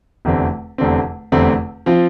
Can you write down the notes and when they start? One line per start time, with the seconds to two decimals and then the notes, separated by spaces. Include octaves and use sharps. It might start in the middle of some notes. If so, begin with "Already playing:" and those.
0.25 F1 E2 D3 A3 C4
0.78 F1 E2 D3 A3 C4
1.32 F1 E2 D3 A3 C4
1.86 F3 C4 F4